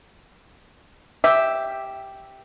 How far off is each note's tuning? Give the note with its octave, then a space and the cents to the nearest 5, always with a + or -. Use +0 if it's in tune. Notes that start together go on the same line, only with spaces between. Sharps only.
G4 +0 E5 -5